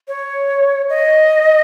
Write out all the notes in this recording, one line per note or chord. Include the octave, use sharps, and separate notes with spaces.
C#5
D#5